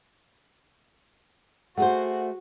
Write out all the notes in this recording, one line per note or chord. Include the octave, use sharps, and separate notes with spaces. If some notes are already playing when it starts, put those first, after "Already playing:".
A3 F#4 G#4 C5 F#5